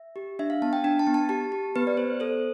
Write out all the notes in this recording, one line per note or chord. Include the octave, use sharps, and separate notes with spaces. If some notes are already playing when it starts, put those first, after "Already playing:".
Already playing: E5
G4
D4 E5
F5
B3 A5
G5
D4 G5
A5
B3
A5
G4 A5
G4
B3 B4
D5
B3 C5
A4 C5